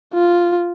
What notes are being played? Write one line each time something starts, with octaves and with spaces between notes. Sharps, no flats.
F4